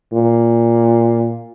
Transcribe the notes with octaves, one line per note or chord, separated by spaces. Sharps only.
A#2